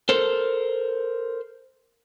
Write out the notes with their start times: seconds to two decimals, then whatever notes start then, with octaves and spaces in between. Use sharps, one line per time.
0.09 A4 A#4 C5